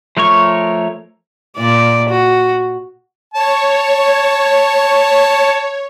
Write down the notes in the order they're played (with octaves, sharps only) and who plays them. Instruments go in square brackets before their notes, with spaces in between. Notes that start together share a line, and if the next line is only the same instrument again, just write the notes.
[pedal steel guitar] F3 A3 A#4 C#5 C#6
[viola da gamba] A#2 D5
F#4
[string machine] C#5 [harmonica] A5